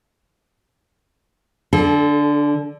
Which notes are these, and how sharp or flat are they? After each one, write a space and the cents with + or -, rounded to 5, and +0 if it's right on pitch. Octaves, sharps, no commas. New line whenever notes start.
D3 +0 A4 -35